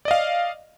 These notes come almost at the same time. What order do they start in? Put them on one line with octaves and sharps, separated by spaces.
D5 D#5 F5